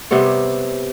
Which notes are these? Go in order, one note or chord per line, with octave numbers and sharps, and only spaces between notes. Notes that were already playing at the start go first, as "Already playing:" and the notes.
C3 G3 B3 C#5